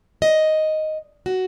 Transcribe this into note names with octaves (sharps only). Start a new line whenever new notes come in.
D#5
F#4